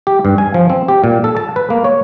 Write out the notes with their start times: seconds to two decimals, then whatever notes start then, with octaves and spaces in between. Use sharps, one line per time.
0.07 G4
0.25 G2
0.38 G#5
0.54 F3
0.70 C4
0.88 G4
1.04 A#2
1.24 A4
1.37 A5
1.56 B4
1.70 A#3
1.84 C#5